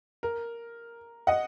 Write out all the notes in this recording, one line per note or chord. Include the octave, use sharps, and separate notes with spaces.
A#4
D#5 F#5